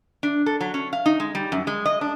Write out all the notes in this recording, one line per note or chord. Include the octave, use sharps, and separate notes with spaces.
D4
A4
F#3
C#4
F5
D#4
G#3
G3
F#2
G#3
D#5
D4